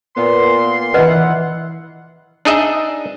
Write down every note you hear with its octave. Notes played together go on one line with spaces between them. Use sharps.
A#2 B3 C6
E3 B4 D#5 F#5
D4 D#4 G#4 D#5 E5